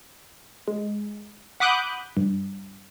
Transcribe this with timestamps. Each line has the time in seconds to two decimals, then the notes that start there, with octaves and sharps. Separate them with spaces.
0.68 G#3
1.60 F#5 B5 D6 D#6 F#6 G6
2.17 G2